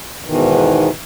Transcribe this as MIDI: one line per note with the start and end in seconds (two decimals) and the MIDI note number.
0.25 0.89 40
0.25 0.89 44
0.25 0.89 47
0.25 0.89 51
0.25 0.89 52